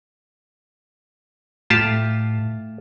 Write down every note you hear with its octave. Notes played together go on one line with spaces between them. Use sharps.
A2 A3 F4 G4 A5